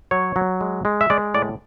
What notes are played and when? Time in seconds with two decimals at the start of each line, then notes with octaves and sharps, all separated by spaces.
0.11 F#3 C#5
0.36 F#3
0.61 G#3
0.85 G#3
1.01 E5
1.10 G#3 D5
1.34 A2 D5